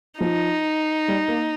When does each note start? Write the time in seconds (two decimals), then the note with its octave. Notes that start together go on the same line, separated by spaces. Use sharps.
0.19 F3 D#4
1.08 G3
1.28 A#3